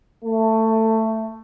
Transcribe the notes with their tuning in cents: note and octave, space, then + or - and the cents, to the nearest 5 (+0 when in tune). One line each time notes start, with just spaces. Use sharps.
A3 +15